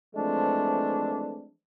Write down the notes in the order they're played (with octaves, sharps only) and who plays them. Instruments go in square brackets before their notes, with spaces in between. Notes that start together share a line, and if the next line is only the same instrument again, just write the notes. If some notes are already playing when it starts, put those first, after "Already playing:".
[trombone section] E3 F3 G#3 A3 C4 D4